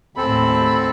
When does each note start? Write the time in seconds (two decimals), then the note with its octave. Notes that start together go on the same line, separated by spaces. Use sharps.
0.17 D#2 A2 C4 A4 B5